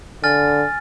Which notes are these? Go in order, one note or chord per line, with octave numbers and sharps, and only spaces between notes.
D3 G#5 F6 A6